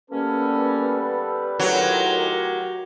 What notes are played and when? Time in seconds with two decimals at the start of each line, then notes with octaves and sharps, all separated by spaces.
0.10 G3 A#3 B3 C#4 A4 B4
1.59 A2 D#3 F#3 F4 G4 A#4